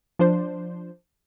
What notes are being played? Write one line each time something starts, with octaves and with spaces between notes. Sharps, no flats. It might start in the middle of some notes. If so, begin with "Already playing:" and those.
F3 D4 C5